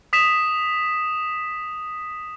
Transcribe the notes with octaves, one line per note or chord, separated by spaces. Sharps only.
D#6 B6 E7